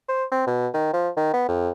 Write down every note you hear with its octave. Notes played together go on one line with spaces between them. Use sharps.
C5
C4
B2
D#3
F3
D#3
B3
F2